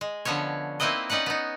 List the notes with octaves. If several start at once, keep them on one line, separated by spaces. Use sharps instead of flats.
G#3
D3 F3 B3 C#4 C#5
A#3 C4 D#4 E4 B4 D#5
C#4 D#4 B4 D5 F#5
B3 D#4